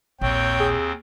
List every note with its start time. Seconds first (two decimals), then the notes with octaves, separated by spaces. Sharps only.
0.21 A#1 D#2 C4 C#5 G5
0.60 G#4